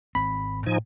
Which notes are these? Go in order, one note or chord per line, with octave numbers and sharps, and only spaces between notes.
G#1 C4 B5
A2 F3 D#4 G#5